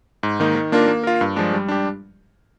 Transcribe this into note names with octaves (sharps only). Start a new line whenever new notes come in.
G#2
D#3 A#3 D#4
D#3
A#3 D4 F4 A#4
A#3
F4 A#4
G2
F3 G#3 D4
G3
D4 G4